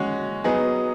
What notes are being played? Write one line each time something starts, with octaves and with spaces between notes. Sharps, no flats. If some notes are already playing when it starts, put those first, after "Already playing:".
Already playing: G#3 C#4 F#4
F#3 B3 D#4 G#4